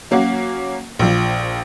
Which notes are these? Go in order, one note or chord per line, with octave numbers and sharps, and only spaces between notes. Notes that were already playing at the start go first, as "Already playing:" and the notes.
F#3 A#3 C#4 F#4
A#1 F3